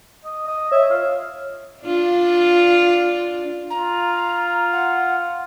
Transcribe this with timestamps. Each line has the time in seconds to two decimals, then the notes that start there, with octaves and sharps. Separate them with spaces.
0.24 D#5
0.47 D#5
0.72 C#5 E5
0.90 F4
1.83 D4 F4
3.70 F4 A#5
4.73 F#5